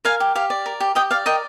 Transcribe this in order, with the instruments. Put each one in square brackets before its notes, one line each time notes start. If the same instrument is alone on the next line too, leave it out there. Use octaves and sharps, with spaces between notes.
[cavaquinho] A#4 F5 G#5
G4
G4 F5
D5
A#4
G4
G4 D#5 G5
D5 F5
A#4 D#5 G5